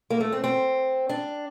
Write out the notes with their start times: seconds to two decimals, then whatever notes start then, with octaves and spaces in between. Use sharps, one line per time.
0.10 A#3
0.20 A3
0.32 C4
0.44 C4
1.09 D4